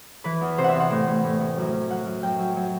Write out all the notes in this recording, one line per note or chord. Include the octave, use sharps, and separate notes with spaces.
E3 B4
E2
C3 C5
E5 F#5
E2
F#5
A2
A2
A2
A2
F#2
F#2
F#2 F#5
F#2
F#2 G5
F#3
F#3